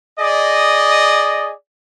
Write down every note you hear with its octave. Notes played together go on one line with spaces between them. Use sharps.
G#4 D5 D#5